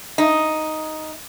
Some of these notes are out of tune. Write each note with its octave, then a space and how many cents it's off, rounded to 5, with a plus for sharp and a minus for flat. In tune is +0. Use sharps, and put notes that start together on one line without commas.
D#4 +5